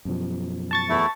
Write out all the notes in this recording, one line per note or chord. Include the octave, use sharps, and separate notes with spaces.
F#2 B2 F3
A5 C#6 A6
E2 A3 E4